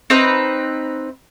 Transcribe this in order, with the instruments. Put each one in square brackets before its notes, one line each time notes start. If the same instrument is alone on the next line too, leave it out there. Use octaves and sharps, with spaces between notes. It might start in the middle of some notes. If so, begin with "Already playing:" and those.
[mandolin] C4 D#4 B4